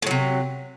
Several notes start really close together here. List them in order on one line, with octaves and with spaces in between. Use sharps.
A2 F#3 C3